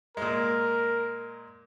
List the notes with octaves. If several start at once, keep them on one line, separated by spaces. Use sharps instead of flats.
A#2 G#3 A#4